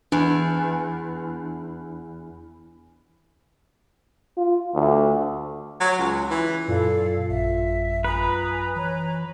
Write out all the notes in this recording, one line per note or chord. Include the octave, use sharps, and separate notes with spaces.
E2 D4
F4
D2
F#3
C#2
E3
F#2 A#2 F4 A4 D5 F5
A1 E5
B4 G#5 A#5 D#6
E3 C#5 A#5